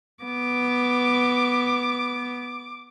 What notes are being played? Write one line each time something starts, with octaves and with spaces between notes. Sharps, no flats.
B3 D6